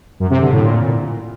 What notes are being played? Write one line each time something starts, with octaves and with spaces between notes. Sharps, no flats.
F#2
C3
D3
A2
A#2